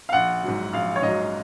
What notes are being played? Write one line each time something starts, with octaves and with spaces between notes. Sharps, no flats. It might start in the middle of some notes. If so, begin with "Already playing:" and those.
F5
A#1 F#5
G#2 F#3
A#1 F5
C#5
G#2 F#3 D#5